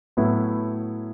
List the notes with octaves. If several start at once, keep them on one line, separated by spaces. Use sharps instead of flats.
A2 F#3 B3 E4